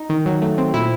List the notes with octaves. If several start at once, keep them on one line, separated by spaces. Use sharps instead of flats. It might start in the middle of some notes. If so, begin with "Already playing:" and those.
Already playing: D#4
D#3
F#3
A3
C4
A#2 E4